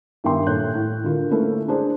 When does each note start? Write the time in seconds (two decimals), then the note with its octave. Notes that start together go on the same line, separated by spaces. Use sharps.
0.24 G2 D#3 B3 E5 G5 C6
0.46 A#2 A4 C#5 F#6 G6
0.75 A2
1.04 D3 F4 A#4
1.31 A3 A#3 C#4 E4 B4
1.68 D4 G#4 C5